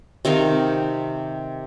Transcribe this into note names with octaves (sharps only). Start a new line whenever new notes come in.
C3 D#3 D#4 F5